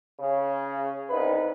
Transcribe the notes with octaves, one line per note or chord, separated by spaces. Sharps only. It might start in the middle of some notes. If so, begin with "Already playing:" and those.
C#3
C2 D#4 B4